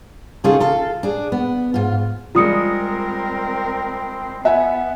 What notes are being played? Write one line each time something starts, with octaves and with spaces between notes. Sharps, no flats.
C#3 C#4 D#4 F4 G#4 A4
F4 A4 F5
D4 G#4
B3
G#2 F4
G3 G#3 C4 F4 A#4 D#6 C#7
B3 E5 F#5 G#5